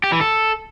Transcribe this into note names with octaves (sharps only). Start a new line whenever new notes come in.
G4
E3
A4